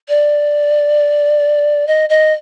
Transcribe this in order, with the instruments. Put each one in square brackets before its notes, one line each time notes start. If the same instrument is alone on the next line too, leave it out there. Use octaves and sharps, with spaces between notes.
[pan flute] D5
D#5
D#5